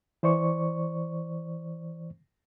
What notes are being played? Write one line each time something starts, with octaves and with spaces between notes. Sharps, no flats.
E3 C5 D5 C#6